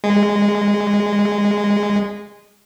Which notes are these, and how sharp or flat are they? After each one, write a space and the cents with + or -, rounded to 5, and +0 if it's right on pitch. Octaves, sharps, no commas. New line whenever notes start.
G#3 -15